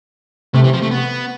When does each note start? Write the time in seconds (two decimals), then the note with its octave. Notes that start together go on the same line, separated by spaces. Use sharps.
0.54 C3 A3
0.64 E3
0.73 F3
0.82 A3
0.91 B3